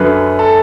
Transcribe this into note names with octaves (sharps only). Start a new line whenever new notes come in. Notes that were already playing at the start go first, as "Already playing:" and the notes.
Already playing: F#2 D3 F#3 B4
A4